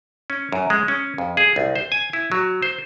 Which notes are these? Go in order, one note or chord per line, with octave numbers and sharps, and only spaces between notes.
C#4
F#2
G#3
C#4
F2
G#4
C2
C5
G#5
E4
F#3
C5